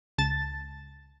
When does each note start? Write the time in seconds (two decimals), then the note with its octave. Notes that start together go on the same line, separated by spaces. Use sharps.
0.18 C#2 A5 A6